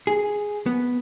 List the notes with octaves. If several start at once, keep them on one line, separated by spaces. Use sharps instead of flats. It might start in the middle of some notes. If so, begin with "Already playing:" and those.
G#4
B3